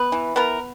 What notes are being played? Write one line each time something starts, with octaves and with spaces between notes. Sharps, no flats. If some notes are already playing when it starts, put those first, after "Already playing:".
Already playing: B3 B4
E3
B3 A#4